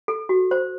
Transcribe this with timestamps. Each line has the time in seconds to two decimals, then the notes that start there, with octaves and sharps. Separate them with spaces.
0.08 A4
0.29 F#4
0.51 C5